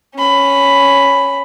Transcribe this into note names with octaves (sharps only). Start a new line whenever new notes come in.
C#4 B5